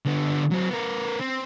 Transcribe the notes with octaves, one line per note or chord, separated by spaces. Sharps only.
D3 B3
F#3 C4
B3 A#4
C4